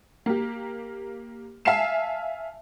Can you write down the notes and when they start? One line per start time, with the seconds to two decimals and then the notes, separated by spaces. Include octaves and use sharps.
0.26 A#3 G4
1.65 E5 F5 G#5 A5 C7 E7